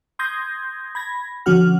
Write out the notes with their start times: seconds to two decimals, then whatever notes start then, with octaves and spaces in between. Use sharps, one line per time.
0.19 C6 D#6 G6 G#6 A#6
0.95 B5 G#6 A#6
1.46 D3 F3 C#4 F#4 F#5 F6